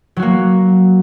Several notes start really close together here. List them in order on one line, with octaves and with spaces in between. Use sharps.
F#3 F#4 A#3